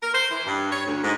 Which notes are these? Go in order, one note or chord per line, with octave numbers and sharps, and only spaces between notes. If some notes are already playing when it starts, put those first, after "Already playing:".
A#4
C5
E3
G2
C#5
D2
G#2